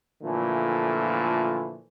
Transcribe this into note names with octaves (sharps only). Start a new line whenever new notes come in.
A#2 D3 E3 F3 A3